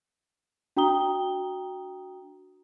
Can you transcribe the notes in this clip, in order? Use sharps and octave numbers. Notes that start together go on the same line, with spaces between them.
D4 F#4 G5 A#5 D#6 G7